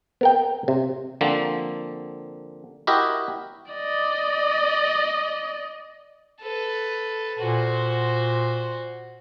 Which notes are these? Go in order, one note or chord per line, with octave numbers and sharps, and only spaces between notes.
B3 A#4 G5
C3
D3 F3 A#3 C4
E4 F#4 G4 A#4 D#5 E5
D5 D#5
A4 B4
A#2 F#4 C5